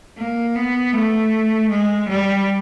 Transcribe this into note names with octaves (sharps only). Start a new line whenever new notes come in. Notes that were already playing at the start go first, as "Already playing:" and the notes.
A#3
B3
A3
G#3
G3